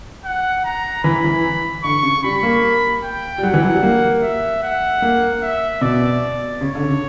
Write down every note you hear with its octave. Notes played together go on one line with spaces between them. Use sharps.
F#5
A#5
E3 B5
E3
D3 C#6
C#3
G3 B5
A#3
G5
G3
F#3 F#5
E3
F#3
G3
A#3
E5
F#5
A#3
E5
B2 D5
C#3 C#5
D3
C#3